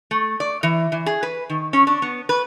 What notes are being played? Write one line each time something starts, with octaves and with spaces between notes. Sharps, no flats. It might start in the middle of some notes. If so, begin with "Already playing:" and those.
A3
D5
E3
E3
G#4
B4
D#3
C#4
D4
B3
B4